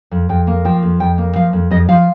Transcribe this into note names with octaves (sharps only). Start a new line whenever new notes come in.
F2
F2 G5
A#3
F3 G5
F2
F2 G5
A#3
F3 F5
F2
F2 D#5
F3 F5